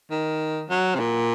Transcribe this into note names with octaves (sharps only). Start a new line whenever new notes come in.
D#3
F#3
C3
A#2